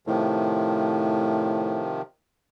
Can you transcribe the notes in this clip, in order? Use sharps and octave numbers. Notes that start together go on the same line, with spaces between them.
A2 C3 D#3 F3